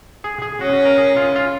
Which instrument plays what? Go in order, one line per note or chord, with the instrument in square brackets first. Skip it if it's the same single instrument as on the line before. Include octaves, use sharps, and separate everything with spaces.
[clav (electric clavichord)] G#4
G#4
[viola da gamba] C#4 [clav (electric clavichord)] F#4
[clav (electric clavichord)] F#4
A#4
G#4
F4
F4